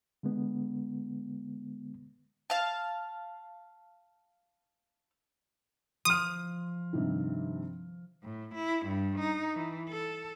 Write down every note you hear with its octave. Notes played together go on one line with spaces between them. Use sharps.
D3 G#3 B3
F5 A5
F3 C6 D#6 F6
G2 C3 D#3
A2
E4
G2
D#4
E3
A4